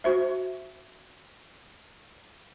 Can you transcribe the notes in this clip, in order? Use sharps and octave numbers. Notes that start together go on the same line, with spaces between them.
F#4 C5 E5